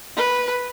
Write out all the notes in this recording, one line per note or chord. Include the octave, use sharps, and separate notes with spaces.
B4